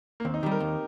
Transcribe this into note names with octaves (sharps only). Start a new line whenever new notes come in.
A#3
D#2 C4
D#4
D#3 G3 G4
A#4
D#2